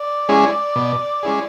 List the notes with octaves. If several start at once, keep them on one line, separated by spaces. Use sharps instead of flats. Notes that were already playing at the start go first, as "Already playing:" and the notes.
Already playing: D5
G#3 C#4 E4 G#4
B2
G#3 C#4 E4 G#4